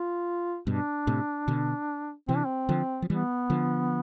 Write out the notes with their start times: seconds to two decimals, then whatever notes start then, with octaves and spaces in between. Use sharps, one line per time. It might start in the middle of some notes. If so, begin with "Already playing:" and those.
Already playing: F4
0.67 G2 B2 D4
1.07 A2 C3
1.48 B2 D3
2.28 C3 E3 C4
2.37 D4
2.45 C4
2.69 D3 F3
3.02 F3
3.10 E3 G3 B3
3.50 D3 F3